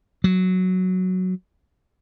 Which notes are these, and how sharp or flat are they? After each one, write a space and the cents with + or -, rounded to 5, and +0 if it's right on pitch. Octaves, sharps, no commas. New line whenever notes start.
F#3 +0